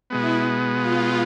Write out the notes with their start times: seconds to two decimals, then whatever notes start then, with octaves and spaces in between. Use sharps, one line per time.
0.10 B2 G#3 B3 E4
0.74 F4